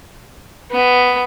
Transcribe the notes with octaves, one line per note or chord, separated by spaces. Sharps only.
B3